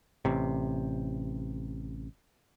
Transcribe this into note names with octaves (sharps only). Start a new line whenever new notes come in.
A1 C3